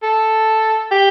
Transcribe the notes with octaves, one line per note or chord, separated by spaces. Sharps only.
A4
G4